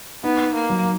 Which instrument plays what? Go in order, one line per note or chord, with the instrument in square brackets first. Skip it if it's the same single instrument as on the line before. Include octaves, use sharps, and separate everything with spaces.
[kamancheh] B3 [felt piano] D#4
[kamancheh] A#3
[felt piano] F#3